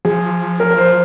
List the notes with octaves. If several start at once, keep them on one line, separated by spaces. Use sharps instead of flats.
F3 G#4
A#4
A#4
C5